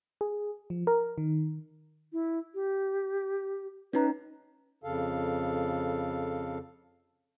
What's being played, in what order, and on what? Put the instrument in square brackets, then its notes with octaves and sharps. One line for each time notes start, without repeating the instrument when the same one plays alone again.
[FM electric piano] G#4
F3
A#4
D#3
[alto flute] E4
G4
[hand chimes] C#4 D#4 A#5 [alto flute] B4
[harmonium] F2 C#3 A4 F5